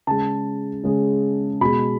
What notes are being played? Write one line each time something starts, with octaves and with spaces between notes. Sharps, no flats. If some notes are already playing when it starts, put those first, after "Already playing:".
C#3 G#3 A5
C#3 G#3
B2 G#3 B5